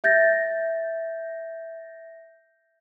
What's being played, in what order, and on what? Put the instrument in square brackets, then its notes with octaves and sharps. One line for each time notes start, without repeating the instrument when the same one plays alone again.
[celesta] E5 G6 A6 A#6